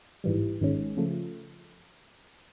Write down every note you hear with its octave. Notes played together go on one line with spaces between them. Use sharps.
A1 G#2 E3 G3
G#1 G#2 D#3 G#3 C#4
C#3 F3 A3